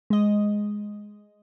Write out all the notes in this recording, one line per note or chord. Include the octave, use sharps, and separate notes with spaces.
G#3 D#5